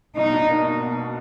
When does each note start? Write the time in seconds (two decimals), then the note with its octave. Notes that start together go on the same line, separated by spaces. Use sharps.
0.17 B2 D#4
0.33 D4
0.49 A#3
0.65 B2
0.81 B2
0.97 B2